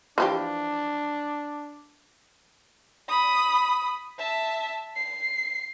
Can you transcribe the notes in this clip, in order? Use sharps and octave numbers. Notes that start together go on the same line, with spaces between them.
E3 F3 D4 G4
B5 D#6
E5 A5
C7